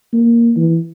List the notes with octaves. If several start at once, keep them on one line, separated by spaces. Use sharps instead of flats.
A#3
E3